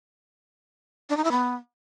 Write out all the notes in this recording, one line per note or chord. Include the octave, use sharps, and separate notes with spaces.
D4
D#4
E4
B3